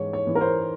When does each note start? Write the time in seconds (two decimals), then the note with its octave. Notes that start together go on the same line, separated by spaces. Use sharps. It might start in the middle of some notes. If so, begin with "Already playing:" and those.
Already playing: G#2 E3 C#5
0.13 C#5
0.27 E3
0.35 A#4
0.41 C5